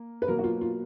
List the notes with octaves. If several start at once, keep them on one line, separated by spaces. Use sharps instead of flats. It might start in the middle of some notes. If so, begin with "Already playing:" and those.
Already playing: A#3
B4
B2 F#3 A#3 A#4
F#4
F4
F4